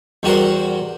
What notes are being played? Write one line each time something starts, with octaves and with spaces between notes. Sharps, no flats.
E2 G3 F#4 A#4 C5